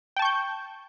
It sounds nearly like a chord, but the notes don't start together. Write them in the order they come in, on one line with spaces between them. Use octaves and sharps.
G5 A5 C#6 G6